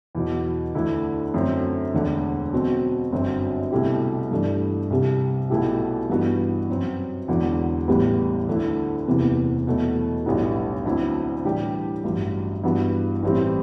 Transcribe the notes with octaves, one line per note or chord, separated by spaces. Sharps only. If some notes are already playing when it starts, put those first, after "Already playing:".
E2 B2 F#3
D2 D3 A3 E4
F#2 D3 A3 C4
E1 D2 D3
B2 F#3 C4 F#4
G1 F#2 D3 F#3 C4
C2 B2 A3 E4 G4
G2 E3 A3 D4
C2 C3 G3
B1 B2 A3 E4 G4
G2 E3 B3 F#4
F#2 F#3 C4
E1 E2 D3 F#3
A1 A2 G3 B3
D2 D3 A3 E4
F#1 E2 C3 E3 B3
E2 B2 F#3 A3
B1 A2 G3 B3 D4
D2 D3 F#3 C4 E4
A2 E3 G3 D4 G4
A1 G2 F#3
G2 E3 B3 F#4
A1 A2 E3 G3 C4